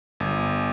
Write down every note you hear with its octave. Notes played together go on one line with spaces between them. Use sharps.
G1